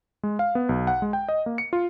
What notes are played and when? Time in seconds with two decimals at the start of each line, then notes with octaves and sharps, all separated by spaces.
0.23 G#3
0.39 F5
0.55 B3
0.69 B1
0.87 F#5
1.02 G#3
1.13 G5
1.29 D#5
1.46 A#3
1.58 C#7
1.73 F4